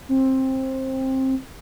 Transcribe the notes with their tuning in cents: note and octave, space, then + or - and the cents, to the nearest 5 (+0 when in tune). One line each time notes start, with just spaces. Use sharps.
C4 +15